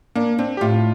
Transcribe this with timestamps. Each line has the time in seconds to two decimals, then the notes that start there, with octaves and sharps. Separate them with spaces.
0.15 A#3 D4
0.38 C4 D4
0.57 G4
0.61 A2 F4